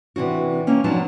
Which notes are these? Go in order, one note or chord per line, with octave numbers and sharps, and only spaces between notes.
C3 E3 D4 F#4
A#3 C4 C#4
F#2 F3 F#3 D4 D#4 A5